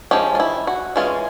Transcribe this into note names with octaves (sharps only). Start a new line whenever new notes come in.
F3 G#3 C#4 G4
F4
E4
F#4
E3 G#3 C#4 F4